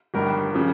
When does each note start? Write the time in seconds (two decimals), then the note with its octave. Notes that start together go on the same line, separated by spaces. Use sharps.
0.14 G1 G2 D#3 A#4
0.54 C#3 F3